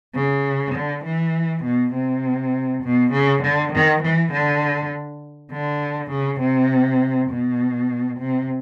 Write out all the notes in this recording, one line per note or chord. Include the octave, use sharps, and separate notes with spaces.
C#3
D3
E3
B2
C3
B2
C#3
D3
D#3
E3
D3
D3
C#3
C3
B2
C3